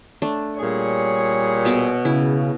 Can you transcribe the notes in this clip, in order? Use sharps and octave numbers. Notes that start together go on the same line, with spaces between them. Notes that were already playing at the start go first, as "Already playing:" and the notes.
A3 D4
A#2 G3 G#4 C#5
B2 E5 D6
C#3 E4